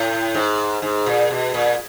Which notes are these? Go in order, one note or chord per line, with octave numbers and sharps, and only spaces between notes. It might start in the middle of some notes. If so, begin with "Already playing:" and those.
Already playing: A2
G#2
G#2
A#2
B2
A#2